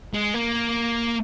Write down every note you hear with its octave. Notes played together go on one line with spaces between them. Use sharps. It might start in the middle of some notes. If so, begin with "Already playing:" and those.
G#3
A#3